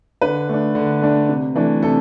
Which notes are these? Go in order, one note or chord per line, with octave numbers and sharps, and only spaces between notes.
D3 B4
A3 D4
D3
A3 D4
C3
E3 A3 D4
C3 A4